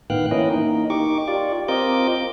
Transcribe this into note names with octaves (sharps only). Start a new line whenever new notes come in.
A2 D#3 B3 F5 G5 F#6
E3 A#3 C#4 E4 D#5 G5
A#3 D#4
D#4 G4 C#6 D6
F4 G4 D5
C4 F4 A#4 D#5 D6 G6